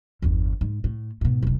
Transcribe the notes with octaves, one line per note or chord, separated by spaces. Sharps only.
G1 E2
G#2
A2
G#2 B2
E1 C2